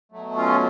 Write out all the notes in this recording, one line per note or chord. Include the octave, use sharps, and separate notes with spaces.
B2 F#3 A3
C#4 F4